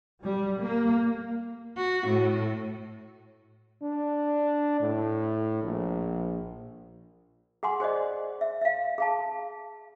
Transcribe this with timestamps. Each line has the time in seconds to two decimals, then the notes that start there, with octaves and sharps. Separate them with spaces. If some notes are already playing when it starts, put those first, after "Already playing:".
0.23 G3
0.62 A#3
1.78 F#4
2.07 A2
3.82 D4
4.80 A2
5.63 A#1
7.63 G#4 F#5 G#5 C6
7.80 G#4 C5 D5 D#5
8.41 E5
8.61 E5 F5
8.98 G#4 F5 A5